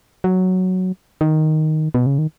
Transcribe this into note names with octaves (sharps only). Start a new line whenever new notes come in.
F#3
D#3
B2
C#3
D#3